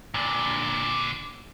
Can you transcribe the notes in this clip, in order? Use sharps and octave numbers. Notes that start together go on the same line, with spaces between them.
A#2 D3